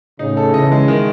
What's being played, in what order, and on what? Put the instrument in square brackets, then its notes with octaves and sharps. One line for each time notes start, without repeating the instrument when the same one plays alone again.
[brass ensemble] A2 C#3 [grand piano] D#4
[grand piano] A4
[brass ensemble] C#3 E3 [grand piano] D#5
[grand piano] G#3
D#3